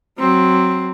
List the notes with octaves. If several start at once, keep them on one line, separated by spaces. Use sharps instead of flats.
F#3 C4